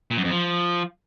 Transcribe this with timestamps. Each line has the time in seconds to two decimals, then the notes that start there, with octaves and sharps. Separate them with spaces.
0.11 A#2
0.17 F#2
0.24 F2
0.31 F3